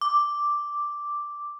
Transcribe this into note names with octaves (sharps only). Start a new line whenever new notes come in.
D6